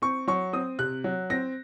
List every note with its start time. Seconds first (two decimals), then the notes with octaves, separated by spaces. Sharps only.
0.02 C4 C#6
0.27 F#3 C#6
0.53 C4 D#6
0.79 C3 F#6
1.04 F#3
1.30 C4 A#6